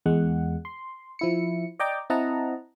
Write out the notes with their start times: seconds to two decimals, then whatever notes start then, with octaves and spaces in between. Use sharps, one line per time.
0.06 E2 G#3 F#5
0.65 C6
1.19 F3 E4 C#7
1.80 D5 D#5 G5 A#5 D6
2.10 C4 E4 D#5 F#5 A5 A#5